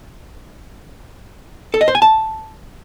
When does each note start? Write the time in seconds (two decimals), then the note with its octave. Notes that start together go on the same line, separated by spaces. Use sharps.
1.74 A4
1.81 D#5
1.88 C5
1.95 G#5
2.02 A5